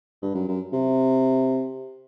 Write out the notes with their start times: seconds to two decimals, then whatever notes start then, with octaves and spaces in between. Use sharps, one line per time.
0.22 G2
0.34 F#2
0.48 F#2
0.73 C3